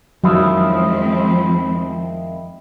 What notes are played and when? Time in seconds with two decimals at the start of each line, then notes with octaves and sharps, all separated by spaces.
0.24 F2 D#3 F3 F#3 G#3 C4 E4